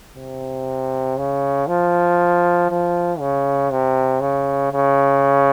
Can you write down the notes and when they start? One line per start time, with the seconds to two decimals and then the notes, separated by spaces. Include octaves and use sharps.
0.16 C3
1.17 C#3
1.68 F3
2.70 F3
3.20 C#3
3.71 C3
4.21 C#3
4.73 C#3